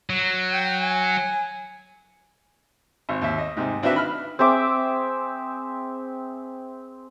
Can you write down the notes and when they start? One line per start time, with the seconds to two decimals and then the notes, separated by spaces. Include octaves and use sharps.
0.10 F#3
0.52 G5
0.80 G#5
3.09 G#1
3.22 D#2 E5
3.38 D#5
3.57 G#2 C3
3.83 C4 D4 E4 F#4 B4 E5
3.94 D#3 B5 F6
4.39 C4 G#4 E5 D6